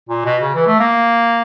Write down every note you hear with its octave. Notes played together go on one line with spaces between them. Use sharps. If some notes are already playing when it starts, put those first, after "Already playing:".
A#2
B2
C#3
E3
A3
A#3